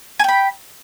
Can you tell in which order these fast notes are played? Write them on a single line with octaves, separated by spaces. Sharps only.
G#5 G5 B5